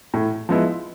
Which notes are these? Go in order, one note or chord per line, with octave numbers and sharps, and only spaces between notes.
A2
F3 G#3 B3 E4